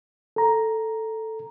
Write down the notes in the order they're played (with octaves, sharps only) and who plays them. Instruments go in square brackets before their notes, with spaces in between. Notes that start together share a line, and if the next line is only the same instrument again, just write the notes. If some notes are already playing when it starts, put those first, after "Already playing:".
[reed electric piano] A4 A#5